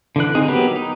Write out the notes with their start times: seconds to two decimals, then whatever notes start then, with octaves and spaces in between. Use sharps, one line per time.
0.16 D3 E3 F#6
0.35 C4 D#4 G#4
0.48 F#3 B3 G4 A#4 B4
0.76 D#4